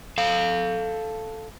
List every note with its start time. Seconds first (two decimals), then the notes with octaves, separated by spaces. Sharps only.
0.18 A4 F5